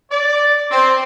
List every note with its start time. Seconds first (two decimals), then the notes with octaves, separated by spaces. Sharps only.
0.11 D5
0.71 C4